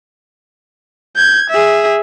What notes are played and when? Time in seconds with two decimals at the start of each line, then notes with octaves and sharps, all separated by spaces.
1.16 G6 G#6
1.50 G#4 E5